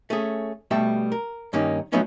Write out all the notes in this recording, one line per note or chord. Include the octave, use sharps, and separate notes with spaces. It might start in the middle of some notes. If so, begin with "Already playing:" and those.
A3 C#4 G#4
B2 G3 A3 G5 A5
A#4
G2 D#3 A#3 C#4 D#4
F3 F#3 A3 B3 C#4 D#4